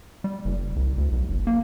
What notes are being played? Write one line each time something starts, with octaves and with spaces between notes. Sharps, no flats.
G3
F#1
C2
D2
B1
F#1
A#3